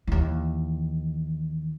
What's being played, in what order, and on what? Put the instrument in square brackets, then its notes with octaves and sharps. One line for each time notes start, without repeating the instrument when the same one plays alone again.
[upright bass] D#2 E3